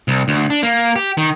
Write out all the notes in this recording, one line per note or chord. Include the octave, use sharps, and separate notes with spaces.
C2
D2
D4
A#3
G4
D#3